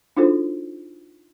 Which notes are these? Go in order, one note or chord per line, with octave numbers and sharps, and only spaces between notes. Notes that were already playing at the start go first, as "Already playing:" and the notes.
D4 D#4 F4 F#4 A4 C5